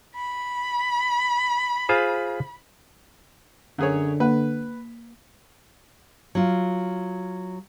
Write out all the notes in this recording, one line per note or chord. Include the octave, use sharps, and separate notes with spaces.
B5
F4 G#4 C5
F#2 D3 G#4 C#5
A#3 B4
F#3 F4